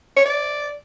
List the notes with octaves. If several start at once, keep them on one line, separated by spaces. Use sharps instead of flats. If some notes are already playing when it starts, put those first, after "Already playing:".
C#5
D5